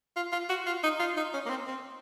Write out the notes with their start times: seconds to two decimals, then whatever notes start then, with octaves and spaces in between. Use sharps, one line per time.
0.16 F4
0.32 F4
0.50 F#4
0.66 F4
0.83 D#4
1.00 F4
1.17 D#4
1.34 C#4
1.46 A#3
1.50 C4
1.67 C4